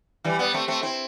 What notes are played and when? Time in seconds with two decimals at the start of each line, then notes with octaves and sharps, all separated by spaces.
0.24 E3 G3
0.39 G3 B3
0.53 A3 C4
0.68 A3 C4
0.83 C4 E4